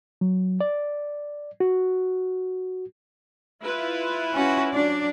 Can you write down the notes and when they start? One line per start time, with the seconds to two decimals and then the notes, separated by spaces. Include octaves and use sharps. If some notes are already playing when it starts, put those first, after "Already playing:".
0.21 F#3
0.61 D5
1.60 F#4
3.62 E4 F4 B4
4.33 C#4 F#4
4.74 F#3 D4 D5